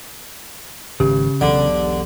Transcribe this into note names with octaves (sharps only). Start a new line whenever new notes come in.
G#1 C#3 G4
E1 B1 D3